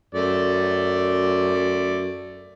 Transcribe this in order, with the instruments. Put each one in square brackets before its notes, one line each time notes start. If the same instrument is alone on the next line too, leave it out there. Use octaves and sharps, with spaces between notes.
[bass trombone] F#2 [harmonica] A3 D5